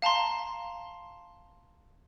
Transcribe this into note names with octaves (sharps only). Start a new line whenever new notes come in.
F5 A5 A#5 C6